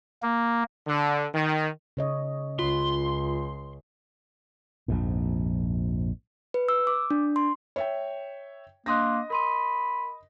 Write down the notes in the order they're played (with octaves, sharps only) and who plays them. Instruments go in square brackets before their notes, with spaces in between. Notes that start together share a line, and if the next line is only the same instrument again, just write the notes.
[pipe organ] A#3
[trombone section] D3
D#3
[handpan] C#3 C#5 D#5
[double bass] C#2 [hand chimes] F4 [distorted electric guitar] C6
[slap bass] A#1 F2 G#2
[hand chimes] B4
E6
D6
D4
C6
[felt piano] C#5 E5 G5
[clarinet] A#3 [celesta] D4 C6 F#6 [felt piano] D#5 D#6 A#6
[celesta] A#4 C6 D#7 [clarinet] B5